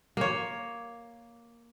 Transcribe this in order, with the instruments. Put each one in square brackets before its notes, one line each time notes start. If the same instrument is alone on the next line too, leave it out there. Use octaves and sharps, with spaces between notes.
[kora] A#3 C#5